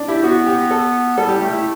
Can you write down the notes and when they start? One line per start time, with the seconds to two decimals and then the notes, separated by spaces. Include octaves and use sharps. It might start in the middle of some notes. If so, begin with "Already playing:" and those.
Already playing: D4
0.08 E4 G4
0.23 B3 F#4
0.46 G4
0.71 A4
1.17 G3 A4
1.29 G4
1.41 A3 G4
1.53 E4